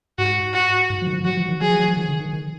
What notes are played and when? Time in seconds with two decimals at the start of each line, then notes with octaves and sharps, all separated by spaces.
0.18 G#2 F#4
0.54 F#4
0.90 G#2
1.02 F3
1.07 D#3
1.13 F3
1.25 F#3 F#4
1.37 F3
1.49 D#3
1.61 F#3 G#4
1.70 F3
1.79 F#3
1.88 F3
1.97 D#3
2.08 D3
2.20 D#3
2.33 D#3